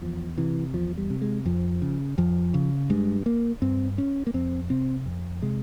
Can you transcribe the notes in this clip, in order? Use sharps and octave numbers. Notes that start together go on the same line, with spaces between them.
E2 F3
C3 E3
E2 F3
G3
C3
G#3
F2 F3
C#3
F2 F3
C#3
G2 G#3
A#3
G2 C4
C#4
A#3
F2 C4
C3 C4
F2
C3 G#3